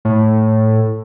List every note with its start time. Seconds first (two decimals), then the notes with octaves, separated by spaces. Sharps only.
0.05 A2